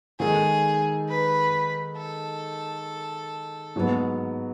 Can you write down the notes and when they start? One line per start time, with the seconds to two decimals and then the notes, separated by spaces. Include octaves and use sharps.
0.19 D#3 G#3 D#4 G#4 A4
1.09 B4
1.97 A4
3.76 G#2 F#3 B3